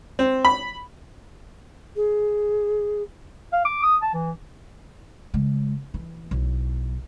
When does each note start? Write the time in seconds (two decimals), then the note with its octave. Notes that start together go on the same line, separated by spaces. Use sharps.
0.19 C4
0.45 B5
1.96 G#4
3.53 F5
3.65 D6
3.83 D#6
4.02 A5
4.14 E3
5.34 C#3 G#3
5.94 E3
6.31 B1 E4